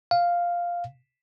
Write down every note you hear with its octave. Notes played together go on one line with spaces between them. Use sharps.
F5